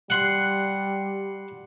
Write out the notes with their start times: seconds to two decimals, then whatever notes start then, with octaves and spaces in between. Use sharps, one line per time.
0.10 G3 F#5 C6